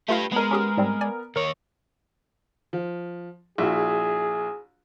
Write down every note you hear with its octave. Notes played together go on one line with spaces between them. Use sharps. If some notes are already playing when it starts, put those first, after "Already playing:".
A3 F4 G4 B4 F5
G#3 B3 A#4
C#4 G4 G#4
G#2 G3 C4
D5 G#5
D#2 A#4 C#5
F3
A#1 E4 F#4 G#4